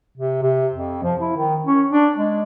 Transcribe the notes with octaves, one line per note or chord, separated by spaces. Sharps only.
C3
C3
F2
F3
E4
D#3
C#4
D4
G#3